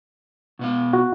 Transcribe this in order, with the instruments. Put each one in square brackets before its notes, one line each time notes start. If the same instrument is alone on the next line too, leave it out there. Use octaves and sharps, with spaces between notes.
[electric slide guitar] B2 B3 F5
[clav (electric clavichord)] F#4